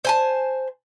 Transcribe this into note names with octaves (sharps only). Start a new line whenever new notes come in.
C5 G#5 A5